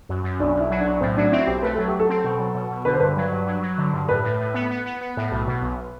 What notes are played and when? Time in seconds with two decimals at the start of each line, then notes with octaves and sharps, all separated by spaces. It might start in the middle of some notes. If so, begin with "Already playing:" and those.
0.09 F#2
0.24 F#2
0.40 B1 D4
0.55 B1
0.60 E4
0.70 F#3
0.80 D4
0.85 B1
1.00 A2 C4
1.17 F#3 D4
1.32 C4 E4
1.47 B1 G4
1.62 A3 B4
1.75 F#3 A4
1.88 G4
1.93 F#3
2.00 A4
2.09 C4
2.24 B2
2.39 F#3
2.55 B2
2.71 B2
2.85 D3 B4
2.93 C5
3.00 G2 B4
3.17 F#3
3.32 G2
3.47 F#3
3.62 F#3
3.78 D3
3.93 G2
4.08 A2 B4
4.24 A2
4.40 A2
4.54 B3
4.71 B3
4.86 B3
5.01 B3
5.17 A2
5.31 B1
5.47 B2
5.62 B1